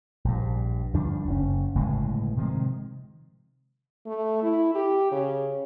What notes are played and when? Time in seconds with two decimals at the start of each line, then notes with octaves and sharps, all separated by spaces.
0.25 A#1 G2
0.93 D2 G2 F3 D4
1.28 F#1 C#4
1.75 G1 A2 C#3 G#3
2.37 C3 D#3 F3 G#3
4.06 A3
4.43 E4
4.75 G4
5.11 C#3